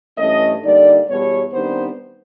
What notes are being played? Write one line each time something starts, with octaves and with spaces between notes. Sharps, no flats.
G2 E3 A3 C#4 D#5
D3 G3 A#3 D#4 D5
E2 B2 G3 C#5
C3 D#3 G3 B3 D4 C5